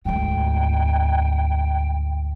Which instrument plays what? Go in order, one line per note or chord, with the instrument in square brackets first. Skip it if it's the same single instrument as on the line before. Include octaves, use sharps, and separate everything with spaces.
[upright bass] D2 G#2 [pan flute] G5